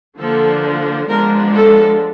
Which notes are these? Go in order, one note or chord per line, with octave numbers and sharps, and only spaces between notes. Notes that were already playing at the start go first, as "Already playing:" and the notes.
D3 F3 A#3 D4 A4
F3 G#3 B3 D4 A#4
A4